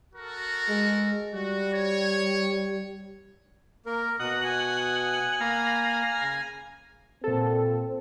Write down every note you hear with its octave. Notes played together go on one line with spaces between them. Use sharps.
F#4 A4 A#4
G#3
G3 F#4
C#5
A#3 A#4
B2 D#5 F#5 D#6
G#5
A#3 F5 A#5 B5
C#3
A#2 C4 A4